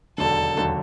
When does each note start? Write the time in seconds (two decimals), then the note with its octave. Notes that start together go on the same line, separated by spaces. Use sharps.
0.18 E1 D#2 D3 F#3 A4
0.56 E1 D#2 D3 F#3